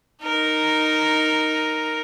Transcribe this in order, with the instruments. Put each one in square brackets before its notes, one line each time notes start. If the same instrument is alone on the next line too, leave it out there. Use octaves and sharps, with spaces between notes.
[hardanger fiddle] D#4 A#4